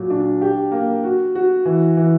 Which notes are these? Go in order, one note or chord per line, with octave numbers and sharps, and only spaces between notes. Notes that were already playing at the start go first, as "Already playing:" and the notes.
Already playing: A#2 F#3
D4
G4
A#3
F#4
F#4
E3
E3